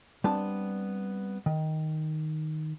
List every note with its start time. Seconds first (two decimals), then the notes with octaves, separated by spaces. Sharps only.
0.24 G3 B3 C4 D4 A5
1.46 D#3